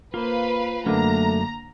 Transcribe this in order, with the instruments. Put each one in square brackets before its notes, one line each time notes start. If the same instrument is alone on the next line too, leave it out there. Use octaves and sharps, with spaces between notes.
[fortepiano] A#3 [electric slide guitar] F4 C5 [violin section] B4 F5
[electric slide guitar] F#2 F#3 [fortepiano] D3 A#3 D4 [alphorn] A3 [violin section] A#5